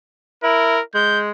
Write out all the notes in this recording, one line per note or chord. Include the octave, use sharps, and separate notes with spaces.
E4 A#4
G#3 G6